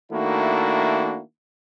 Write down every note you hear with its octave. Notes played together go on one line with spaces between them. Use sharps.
D#3 A3 A#3 D4 E4 F#4